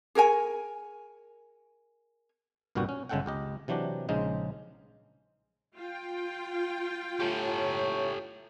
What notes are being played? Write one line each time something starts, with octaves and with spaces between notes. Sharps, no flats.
G#4 A#4 C#5 G#5
C2 G2 A#2 B3 F#4 G5
C#4
G1 C#3 G#3 A4 F#5 G5
C#2 G4 D#5
C3 E3 F#3 D4 G4
A#1 C#3 G#3 D#4 C5
F4 G5
A2 G4 A4 C#5 C#6